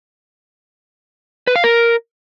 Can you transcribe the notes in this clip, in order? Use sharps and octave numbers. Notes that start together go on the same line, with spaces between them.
B4
F5
A#4